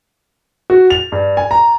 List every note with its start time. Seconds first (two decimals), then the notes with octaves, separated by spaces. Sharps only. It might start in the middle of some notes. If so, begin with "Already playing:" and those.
0.70 F#4
0.90 F7
1.12 G2
1.37 G#5
1.51 A#5